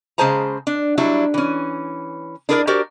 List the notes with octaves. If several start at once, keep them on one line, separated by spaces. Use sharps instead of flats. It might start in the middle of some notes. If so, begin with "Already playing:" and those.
C#3 G#3 G#4 C5 A5 A#5
D4
F#3 G3 D4 E4
E3 C#4
D4 E4 G#4 A#4 B4 D5
F#4 G4 A#4 C5 D5